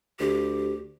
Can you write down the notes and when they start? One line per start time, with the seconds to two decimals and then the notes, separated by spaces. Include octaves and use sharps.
0.20 D2 G4